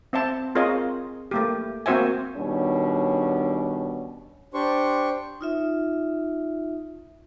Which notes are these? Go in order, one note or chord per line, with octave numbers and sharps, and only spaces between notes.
C4 C5 E5 A5
C4 F4 G#4 A#4 C#5 D#5
A3 A#3 G4
A#3 C4 F#4 C5 E5 G#5
B2 D#3 G3 C#4 D4
D4 G4 C5 C#6
D#4 F4 E5